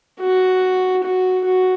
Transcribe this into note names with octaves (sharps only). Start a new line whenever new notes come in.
F#4
F#4
F#4